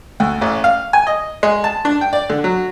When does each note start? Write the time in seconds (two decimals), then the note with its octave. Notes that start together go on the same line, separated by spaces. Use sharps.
0.20 D2
0.41 A1
0.64 F5
0.93 G#5
1.07 D#5
1.43 G#3
1.64 A5
1.85 D4
2.01 G5
2.13 D5
2.30 D3
2.44 F#3